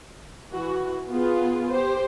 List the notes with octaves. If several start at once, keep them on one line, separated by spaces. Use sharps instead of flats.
E3 F#4
B3 F4 G#4
G4 C5